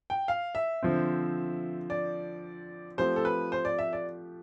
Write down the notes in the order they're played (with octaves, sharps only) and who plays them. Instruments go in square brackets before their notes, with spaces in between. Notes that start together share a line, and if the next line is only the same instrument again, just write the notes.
[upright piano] G5
F5
E5
[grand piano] D3 F3 C4
[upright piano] D5
[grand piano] F3 A3 C4 G4 [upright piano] C5
[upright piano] A4
B4
C5
D5
E5
D5